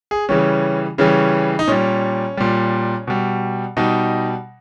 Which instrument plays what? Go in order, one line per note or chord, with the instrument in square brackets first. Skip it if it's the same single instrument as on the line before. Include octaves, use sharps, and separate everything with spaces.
[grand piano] G#4
C#3 E3 G3 C#4
C#3 E3 G3 C#4
D#4
A#2 G3 C#4
A#2 G3
B2 G3
B2 G3 D#4